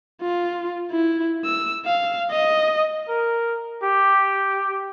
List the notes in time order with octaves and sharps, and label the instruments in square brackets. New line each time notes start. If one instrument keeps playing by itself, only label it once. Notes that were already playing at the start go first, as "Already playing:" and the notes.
[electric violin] F4
E4
E6
F5
D#5
[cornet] A#4
G4